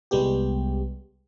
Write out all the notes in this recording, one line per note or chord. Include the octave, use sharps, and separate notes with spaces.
C2 G3 G#3 B3 G4